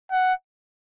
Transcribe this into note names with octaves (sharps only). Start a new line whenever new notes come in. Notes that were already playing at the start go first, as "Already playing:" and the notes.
F#5